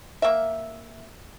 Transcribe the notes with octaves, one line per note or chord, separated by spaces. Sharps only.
A#3 E5